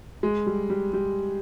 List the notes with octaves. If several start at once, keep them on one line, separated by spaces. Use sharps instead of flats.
G#3
G3
G3
G3